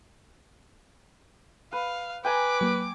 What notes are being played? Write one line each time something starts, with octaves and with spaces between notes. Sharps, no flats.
B4 F5
B4 G5 G#5 A#5 D6
F#3 A#3